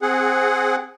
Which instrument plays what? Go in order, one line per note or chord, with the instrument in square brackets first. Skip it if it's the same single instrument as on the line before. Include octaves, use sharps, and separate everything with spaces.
[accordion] C4 G#4 F#5